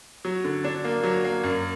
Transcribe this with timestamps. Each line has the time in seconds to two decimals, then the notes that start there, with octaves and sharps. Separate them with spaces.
0.25 F#3
0.44 D3
0.64 D4
0.84 A#3
1.04 F#3
1.24 A#3
1.43 F#2